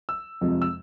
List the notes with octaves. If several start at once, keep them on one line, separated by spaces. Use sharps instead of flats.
E6
F2 C3 F3 G#3
E6